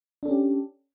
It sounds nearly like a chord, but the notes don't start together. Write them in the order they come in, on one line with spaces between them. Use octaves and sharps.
D4 A4 C#4 G4